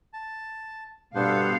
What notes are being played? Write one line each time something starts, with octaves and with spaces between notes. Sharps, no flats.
A5
G2 B2 B3 D4 A4 C5 F5